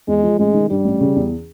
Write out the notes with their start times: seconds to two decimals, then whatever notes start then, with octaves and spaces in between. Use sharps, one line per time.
0.08 E2 G#3
0.23 F3
0.39 A1 G#3
0.54 D#3
0.70 G2 G3
0.85 A1
1.00 C#3
1.16 E2